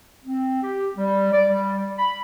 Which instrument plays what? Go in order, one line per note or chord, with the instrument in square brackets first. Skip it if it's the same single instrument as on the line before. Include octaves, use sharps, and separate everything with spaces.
[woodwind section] C4
G4
G3
D5
G3
B5